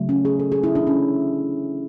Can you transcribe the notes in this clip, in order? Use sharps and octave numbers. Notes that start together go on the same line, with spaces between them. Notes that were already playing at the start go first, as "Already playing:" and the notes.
Already playing: C#3 F#3 A3
C#4
G#4
A4
G#4
E4
D4
C#4